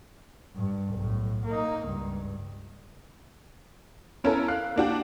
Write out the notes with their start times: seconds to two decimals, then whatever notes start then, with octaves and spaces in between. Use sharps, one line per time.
0.55 G2
0.94 B1 A2
1.45 A#3 D#4
1.85 C#2 G2
4.24 B3 C#4 E4 A4 A#4
4.48 F5 F#6
4.76 A#3 D4 F#4 G4